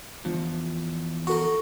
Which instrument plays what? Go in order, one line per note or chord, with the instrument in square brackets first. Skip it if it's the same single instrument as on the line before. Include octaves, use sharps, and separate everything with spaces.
[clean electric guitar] E2 [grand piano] F3
[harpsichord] F#4 A#4 [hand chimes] A4 C#6